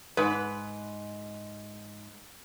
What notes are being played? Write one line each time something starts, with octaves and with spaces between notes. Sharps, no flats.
G#2 B4